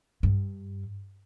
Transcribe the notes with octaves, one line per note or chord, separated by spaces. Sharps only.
G2